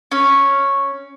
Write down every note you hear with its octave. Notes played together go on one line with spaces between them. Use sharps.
C#4